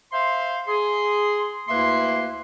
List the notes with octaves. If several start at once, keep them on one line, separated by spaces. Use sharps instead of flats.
C5 E5 F5 C6
G#4 C6
D2 A#3 E4 B4 E5 C6